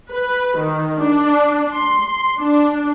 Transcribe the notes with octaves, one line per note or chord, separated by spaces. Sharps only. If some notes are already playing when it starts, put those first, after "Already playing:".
B4
D#3
D4
C6
D4